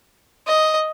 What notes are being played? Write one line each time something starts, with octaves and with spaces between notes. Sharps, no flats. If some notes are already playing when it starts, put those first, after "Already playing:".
D#5